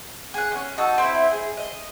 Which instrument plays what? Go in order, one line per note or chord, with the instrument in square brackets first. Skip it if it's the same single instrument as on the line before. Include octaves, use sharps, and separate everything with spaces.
[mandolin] G#4 F#5
B3 C#4
D#4 F#4 A5 E6
C4 E4
G#4
D#5